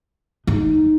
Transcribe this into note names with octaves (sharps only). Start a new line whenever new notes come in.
D#4